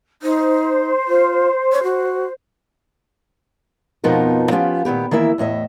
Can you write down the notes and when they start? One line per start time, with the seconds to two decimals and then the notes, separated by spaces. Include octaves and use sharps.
0.22 D#4 C5
1.08 F4
1.72 C#5
1.83 F#4
4.04 F2 B2 F3 B3 D#4 A#4
4.51 F3 B3 C#4 F4 G4
4.85 A#2 D#3 B3 G4
5.11 D#3 E3 A#3 E4 E5
5.38 E2 A2 D#5 E5